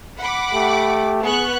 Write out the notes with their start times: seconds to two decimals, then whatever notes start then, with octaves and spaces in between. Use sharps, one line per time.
0.19 F#5 B5 D6
0.54 A3 G4
1.23 B3 G#4 C#6 F#6